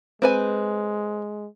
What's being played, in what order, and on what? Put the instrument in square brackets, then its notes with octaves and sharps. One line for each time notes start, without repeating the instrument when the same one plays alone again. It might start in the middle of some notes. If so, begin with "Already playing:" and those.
[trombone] G#3 [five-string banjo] C4 B4 G#5